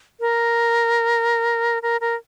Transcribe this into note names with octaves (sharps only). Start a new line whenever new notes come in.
A#4
A#4
A#4